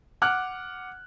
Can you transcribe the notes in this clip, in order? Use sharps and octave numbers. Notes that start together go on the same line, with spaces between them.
F#5 D6 F6 F#6